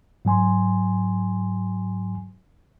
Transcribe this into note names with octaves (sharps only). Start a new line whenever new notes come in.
G#2 F#3 G#5 C6